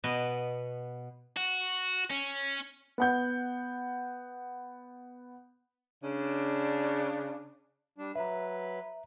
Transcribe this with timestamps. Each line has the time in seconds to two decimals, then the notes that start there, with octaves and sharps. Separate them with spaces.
0.04 B2 B3 D#5
1.37 F#4
2.10 C#4
2.98 B3 F#5 G6
6.02 C#3 D4
7.98 G3 D4
8.16 F#3 B4 E5 A#5